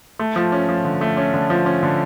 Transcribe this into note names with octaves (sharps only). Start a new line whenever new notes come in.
A3
F3
C#4
F3
D3
A3
C#4
D3
F3
C#4
D3